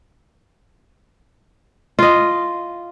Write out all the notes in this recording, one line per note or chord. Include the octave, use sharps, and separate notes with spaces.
F4 D#5